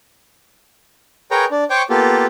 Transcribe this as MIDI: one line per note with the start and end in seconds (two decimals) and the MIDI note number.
1.31 1.45 68
1.31 1.45 70
1.31 1.45 71
1.31 1.45 73
1.31 1.45 79
1.31 1.45 82
1.51 1.64 62
1.70 1.82 72
1.70 1.82 73
1.70 1.82 79
1.70 1.82 85
1.70 1.82 86
1.90 2.26 58
1.90 2.26 59
1.90 2.26 65
1.90 2.26 67
1.90 2.26 69